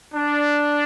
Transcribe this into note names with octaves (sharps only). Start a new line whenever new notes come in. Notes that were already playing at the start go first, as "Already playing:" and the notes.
D4